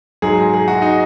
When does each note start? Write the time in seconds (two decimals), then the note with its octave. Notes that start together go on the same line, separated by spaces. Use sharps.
0.22 G#2 F#3 G#4
0.54 G#4
0.68 F#4
0.82 D#4